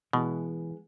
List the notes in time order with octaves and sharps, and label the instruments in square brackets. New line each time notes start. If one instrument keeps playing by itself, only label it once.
[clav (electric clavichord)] B2 [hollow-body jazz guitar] E3 G#3 B3